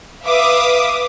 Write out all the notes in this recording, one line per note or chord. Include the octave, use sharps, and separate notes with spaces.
B4 E5 F5 D6 D#6